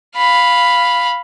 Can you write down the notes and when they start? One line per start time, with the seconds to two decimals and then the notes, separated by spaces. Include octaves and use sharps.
0.16 F5 B5